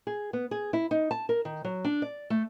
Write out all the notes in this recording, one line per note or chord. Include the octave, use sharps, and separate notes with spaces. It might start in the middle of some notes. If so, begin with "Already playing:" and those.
G#4
B3
G#4
E4
D#4
A5
A#4
D#3
F#3
D4
D5
A3